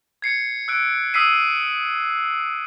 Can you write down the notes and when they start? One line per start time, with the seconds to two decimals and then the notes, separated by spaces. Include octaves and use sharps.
0.22 G#6 C7 C#7
0.68 E6 F#6 D7
1.14 D#6 E6 B6 C7 D#7